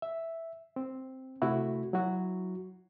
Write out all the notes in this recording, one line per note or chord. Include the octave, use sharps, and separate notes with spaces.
E5
C4
C3 A3 E4 F#4
F#3 E4 F#4